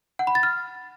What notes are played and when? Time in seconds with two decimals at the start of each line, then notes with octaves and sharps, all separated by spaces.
0.19 F#5
0.27 B5
0.35 A6
0.43 F6